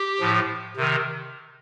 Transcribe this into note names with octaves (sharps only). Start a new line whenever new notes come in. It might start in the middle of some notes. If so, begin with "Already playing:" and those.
Already playing: G4
A2 F3
C3 D#3